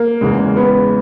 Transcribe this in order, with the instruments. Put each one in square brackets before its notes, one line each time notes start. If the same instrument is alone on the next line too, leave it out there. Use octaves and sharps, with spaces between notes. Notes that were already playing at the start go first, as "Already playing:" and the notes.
Already playing: [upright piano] A#3
[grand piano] E2 C#3 G#3
[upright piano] B3